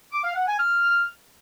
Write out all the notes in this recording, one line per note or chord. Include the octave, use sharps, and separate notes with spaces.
D6
F5
F#5
G#5
F6